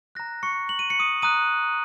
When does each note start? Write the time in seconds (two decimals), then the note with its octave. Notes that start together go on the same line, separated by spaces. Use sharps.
0.15 A#5 F#6 A#6
0.43 C#6 C#7
0.69 F#7
0.79 D#7
0.90 C#7
1.00 D#6 D#7
1.22 A#5 D#6 F#6 D#7